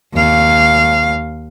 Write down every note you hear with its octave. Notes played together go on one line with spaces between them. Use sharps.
D#2 F5